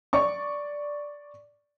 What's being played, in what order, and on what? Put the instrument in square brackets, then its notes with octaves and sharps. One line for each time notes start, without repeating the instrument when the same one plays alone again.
[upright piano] D5 C#6